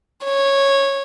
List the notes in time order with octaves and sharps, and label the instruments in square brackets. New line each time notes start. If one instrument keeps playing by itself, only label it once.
[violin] C#5